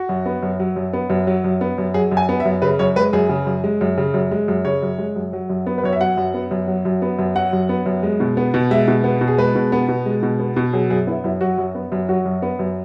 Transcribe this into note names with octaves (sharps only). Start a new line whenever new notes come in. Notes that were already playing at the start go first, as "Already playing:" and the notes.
Already playing: F#4
F#2
B3
F#2
F#3
F#2
B3
F#2
F#3
F#2
B3
F#2
F#3 G#4
F#2
G#5
B3
E5
F#2
C#3 B4
F#2 C#5
G#3 B4
F#2 G#4
C#3
F#2
G#3
F#2
C#3
F#2
G#3
F#2
C#3 C#5
F#2
G#3
F#2
F#3
F#2
B3
B4
F#2 C#5
E5
F#3 F#5
F#2
B3
F#2
F#3
F#2
B3
F#2
F#3 F#5
F#2
B3
F#2
G#3
B2
B3
B2
G#3 E5
B2
B3
B2
G#4
G#3 B4
B2
B3
B2
G#3
B2
B3
B2
F#3 G#4
F#2 G#4
B3 E4
F#2 E4
F#3 F#4
F#2
B3
F#2
F#3 F#4
F#2
B3
F#2